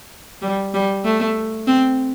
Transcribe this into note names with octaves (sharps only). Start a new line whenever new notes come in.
G3
G3
A3
C4